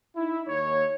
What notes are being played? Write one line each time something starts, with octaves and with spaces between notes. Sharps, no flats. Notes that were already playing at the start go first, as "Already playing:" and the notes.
D#4 E4
D#2 C#5